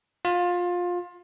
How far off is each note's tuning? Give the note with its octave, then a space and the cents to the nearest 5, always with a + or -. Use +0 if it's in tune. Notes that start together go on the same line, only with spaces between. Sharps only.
F4 +20